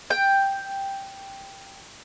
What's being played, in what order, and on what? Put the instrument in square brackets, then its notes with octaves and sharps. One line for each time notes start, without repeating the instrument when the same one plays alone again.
[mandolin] G5